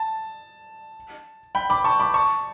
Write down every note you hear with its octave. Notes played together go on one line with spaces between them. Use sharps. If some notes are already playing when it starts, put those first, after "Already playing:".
Already playing: A5
G5 B5
B5 D6
A5 C#6
B5 D6
A5 C#6